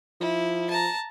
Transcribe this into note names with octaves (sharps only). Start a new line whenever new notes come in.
F3 E4
A5 A#5